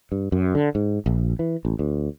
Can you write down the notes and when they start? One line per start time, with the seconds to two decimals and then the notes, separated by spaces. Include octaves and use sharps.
0.12 G2
0.32 F#2
0.55 D3
0.75 G#2
1.06 A#1
1.39 E3
1.65 A1
1.79 D2